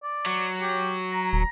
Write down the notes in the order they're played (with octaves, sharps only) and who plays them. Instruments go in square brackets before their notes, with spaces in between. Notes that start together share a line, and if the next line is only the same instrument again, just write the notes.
[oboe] D5
[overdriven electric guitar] F#3
[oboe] G4
A#5
[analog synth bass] D#1